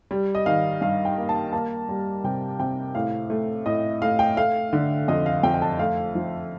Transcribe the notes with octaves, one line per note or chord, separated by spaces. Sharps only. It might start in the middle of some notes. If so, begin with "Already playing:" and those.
G3
D#5
D#3 F5
G2 F5
G5
A#3
A5
A#3 A5
G3
C3 G5
C3 G5
A2 F5
A3
A2 D#5
A3 F5
G5
A3 F5
D3
F2 D#5
F5
F2 G5
G5
A5
A3 F5
F3